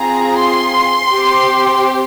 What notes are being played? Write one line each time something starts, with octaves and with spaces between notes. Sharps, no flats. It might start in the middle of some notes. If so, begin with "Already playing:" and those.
Already playing: C4 F4 G#4 A#5
C6
C4 G4